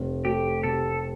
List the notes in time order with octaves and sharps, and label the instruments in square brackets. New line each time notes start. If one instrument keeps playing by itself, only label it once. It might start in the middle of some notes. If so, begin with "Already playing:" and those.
Already playing: [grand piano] F1
[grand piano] A3 [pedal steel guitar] G4
[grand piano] C3 [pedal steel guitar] A4